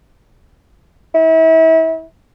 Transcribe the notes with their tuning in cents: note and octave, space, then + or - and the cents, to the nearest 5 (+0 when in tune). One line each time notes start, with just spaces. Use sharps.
E4 -35